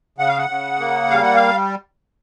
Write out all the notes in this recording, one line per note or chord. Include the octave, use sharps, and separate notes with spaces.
C#3 F#5
F5
F#5
C#3
A#3
G3 F5
F#5
F5